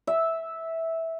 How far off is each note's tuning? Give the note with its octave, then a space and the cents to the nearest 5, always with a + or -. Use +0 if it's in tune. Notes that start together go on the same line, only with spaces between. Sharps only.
E5 -10